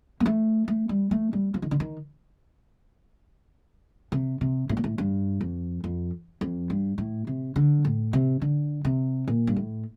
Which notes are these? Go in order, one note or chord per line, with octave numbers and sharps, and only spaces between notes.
A#3
A3
A3
G3
A3
G3
F3
D#3
D3
D#3
C3
C3
A2
A#2
A2
G2
F2
F2
F2
G2
A2
C3
D3
A2
C3
D3
C3
A#2
G2
A2